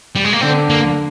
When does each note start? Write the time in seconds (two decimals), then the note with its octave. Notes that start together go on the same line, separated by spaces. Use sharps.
0.15 G3
0.24 G#3
0.33 A#3
0.41 D3 C4
0.70 A#3